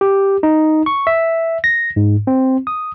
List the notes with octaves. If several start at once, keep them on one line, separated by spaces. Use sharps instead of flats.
G4
D#4
C#6
E5
A#6
G#2
C4
D#6